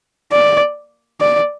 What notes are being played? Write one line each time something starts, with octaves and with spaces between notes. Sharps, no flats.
D5
D5